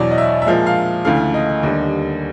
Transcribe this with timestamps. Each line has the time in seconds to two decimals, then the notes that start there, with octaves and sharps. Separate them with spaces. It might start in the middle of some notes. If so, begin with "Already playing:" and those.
Already playing: E2 B2 F#3 D5
0.11 D#5
0.18 E5
0.42 E5
0.46 A#2 F3 G#3 F5
0.66 F5
1.05 D2 C#3 E3 A3 F5
1.34 D#5
1.63 D#2 D3 G3